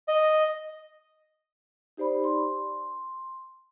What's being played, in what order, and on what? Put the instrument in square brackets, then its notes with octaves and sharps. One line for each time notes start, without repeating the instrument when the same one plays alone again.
[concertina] D#5
[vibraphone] D#4 G4 C5 D5 B5
C6